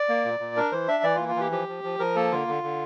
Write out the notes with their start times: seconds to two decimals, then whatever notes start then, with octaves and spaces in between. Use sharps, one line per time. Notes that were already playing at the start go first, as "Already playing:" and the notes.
Already playing: D5
0.09 A#3
0.25 A#2
0.40 A#2
0.56 D4 A#4
0.72 E3 C5
0.88 D4 E5
1.03 E3 D5
1.16 F4
1.20 A#3
1.28 F4
1.36 E3 G4
1.51 F3 G4
1.68 F3
1.84 F3
1.99 F3 A#4
2.16 A#3 A4
2.32 D3 F4
2.48 D3
2.63 D3